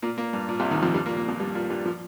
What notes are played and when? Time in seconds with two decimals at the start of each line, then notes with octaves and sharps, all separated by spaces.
0.02 A#2 A#3
0.17 A#2 A#3
0.33 G2
0.49 A#2
0.59 C2 C3
0.71 D#2 D#3
0.82 F2 F3
0.94 G2 G3
1.06 A#2 A#3
1.17 A#2 A#3
1.28 F2 F3
1.40 G2 G3
1.55 A#2 A#3
1.70 G2 G3
1.86 F3